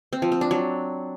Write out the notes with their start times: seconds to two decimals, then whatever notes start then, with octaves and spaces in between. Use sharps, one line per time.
0.13 C4
0.22 F3
0.32 C4
0.41 D4
0.51 F#3